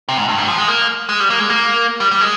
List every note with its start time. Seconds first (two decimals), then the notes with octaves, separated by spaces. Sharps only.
0.09 C3
0.17 G#2
0.28 G2
0.38 G#2
0.48 F3
0.58 G#3
0.68 A#3
1.09 G#3
1.20 G3
1.30 A#3
1.39 G#3
1.50 A#3
2.00 G3
2.11 G3
2.21 G#3